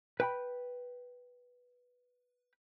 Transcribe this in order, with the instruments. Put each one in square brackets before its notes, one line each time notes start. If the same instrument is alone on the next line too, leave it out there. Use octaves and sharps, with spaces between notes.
[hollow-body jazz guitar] B4 G5 B5